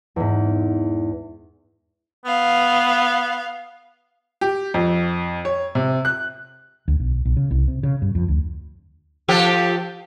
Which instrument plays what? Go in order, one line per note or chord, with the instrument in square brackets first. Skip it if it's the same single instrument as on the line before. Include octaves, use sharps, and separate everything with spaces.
[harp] E2 G#2
[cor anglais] B3 [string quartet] F5
[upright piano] G4
F2
C#5
C3
F#6
[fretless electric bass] D2
B1
B1
C#3
C2
C3
C#3
G2
F2
D2
[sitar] F3 G4 A4